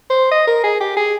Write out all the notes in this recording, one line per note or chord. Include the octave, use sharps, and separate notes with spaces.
C5
D#5
A#4
G#4
G4
G#4